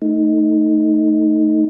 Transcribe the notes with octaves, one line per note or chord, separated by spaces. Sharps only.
A3 D#4